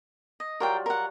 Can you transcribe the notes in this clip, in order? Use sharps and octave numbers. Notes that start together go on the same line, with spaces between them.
D#5
F#3 G3 F4 A#4 C5 G5
A#4 F#5